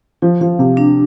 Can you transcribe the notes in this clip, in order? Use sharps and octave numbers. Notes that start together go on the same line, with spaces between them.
F3 F4
F3 F5
C3 F5
D4